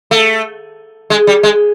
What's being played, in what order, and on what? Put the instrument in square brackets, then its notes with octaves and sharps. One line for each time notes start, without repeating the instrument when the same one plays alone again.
[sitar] A3
G#3
G3
G#3